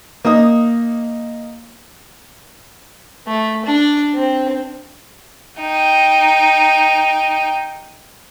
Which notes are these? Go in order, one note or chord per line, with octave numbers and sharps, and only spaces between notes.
A#3 D#4 D#6
A3
D4
C4
D#4 G5